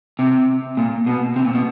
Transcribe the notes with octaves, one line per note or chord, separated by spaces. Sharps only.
C3
A#2
B2
C3
A#2
B2